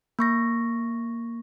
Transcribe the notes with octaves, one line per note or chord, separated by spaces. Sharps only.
A#3 C#6 A#6